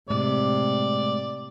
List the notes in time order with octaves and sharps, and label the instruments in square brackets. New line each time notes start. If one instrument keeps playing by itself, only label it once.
[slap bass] A2 G#3 [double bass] C3 [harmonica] D5